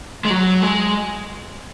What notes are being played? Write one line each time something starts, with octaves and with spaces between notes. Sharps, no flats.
G#3
F#3
G#3